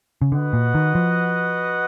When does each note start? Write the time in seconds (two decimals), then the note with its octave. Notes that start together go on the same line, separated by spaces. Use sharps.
0.22 C#3
0.32 D3 F#4 B4 D#5 F#5
0.53 A#2
0.75 D#3
0.95 F3